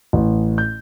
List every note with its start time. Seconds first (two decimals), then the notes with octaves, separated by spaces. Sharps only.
0.13 A1
0.58 G6